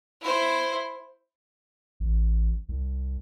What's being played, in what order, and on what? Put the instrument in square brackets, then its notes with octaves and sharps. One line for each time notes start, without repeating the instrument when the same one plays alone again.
[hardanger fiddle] E4 C5
[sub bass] A1
C2